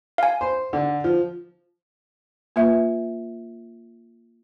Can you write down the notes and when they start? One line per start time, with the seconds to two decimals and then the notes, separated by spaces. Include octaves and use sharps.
0.18 F5 G#5
0.41 C5
0.73 D3
1.04 F3
2.56 A#3 F4 B4 E5